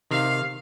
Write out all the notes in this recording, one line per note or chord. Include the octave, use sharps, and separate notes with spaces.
C3 D#3 F5